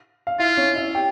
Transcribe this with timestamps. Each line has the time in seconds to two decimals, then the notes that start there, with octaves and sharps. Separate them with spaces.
0.27 F5
0.39 E4 F4 E5
0.57 C#4 C#5
0.76 E4 E5
0.95 G4 G5